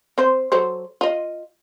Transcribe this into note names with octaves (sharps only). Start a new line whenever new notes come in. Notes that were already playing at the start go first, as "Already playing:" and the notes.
C4 C5
F#3 A4 C5
F4 D#5